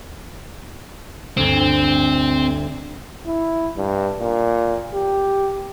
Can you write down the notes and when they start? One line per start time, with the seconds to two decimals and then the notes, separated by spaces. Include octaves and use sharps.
1.37 G1 D2 C4
3.26 E4
3.77 G2
4.20 A#2
4.94 G4